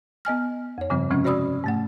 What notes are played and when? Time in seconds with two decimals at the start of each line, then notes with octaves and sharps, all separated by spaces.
0.25 B3 D#5 G#5 F6
0.78 F2 C#5
0.90 G2 C#3 F3 G3 C4
1.11 C3 F3 G#3 C4 C#4
1.24 F#4 C5 D5 B5 D#6 E6
1.64 G#2 A3 F#5